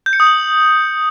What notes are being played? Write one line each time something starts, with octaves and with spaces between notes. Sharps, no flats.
G6
C#7
D#6
F#7